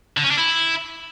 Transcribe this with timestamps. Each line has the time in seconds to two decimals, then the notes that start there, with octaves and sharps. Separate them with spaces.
0.17 D3
0.24 C#4
0.31 D4
0.37 E4